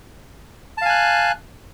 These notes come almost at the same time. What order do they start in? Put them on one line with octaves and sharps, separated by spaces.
A5 F5 G#5 F#6